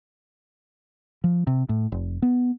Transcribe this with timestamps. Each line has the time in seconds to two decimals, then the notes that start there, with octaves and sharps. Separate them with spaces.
1.24 F3
1.47 C3
1.69 A2
1.92 F1
2.22 B3